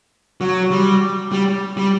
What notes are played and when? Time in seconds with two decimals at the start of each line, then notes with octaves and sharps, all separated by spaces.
0.41 F#3
0.71 G3
1.32 G3
1.77 G3